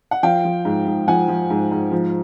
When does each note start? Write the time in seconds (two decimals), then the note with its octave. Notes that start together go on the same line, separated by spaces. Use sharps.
0.11 F#5
0.23 F3 F5 G5
0.45 F3
0.65 G#2
0.87 G#2
1.08 F3 F#5 G#5
1.28 F3
1.50 G#2
1.72 G#2
1.92 F3